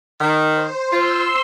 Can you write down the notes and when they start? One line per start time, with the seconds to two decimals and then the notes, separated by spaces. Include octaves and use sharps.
0.21 D#3
0.52 C5
0.92 F4 C6 E6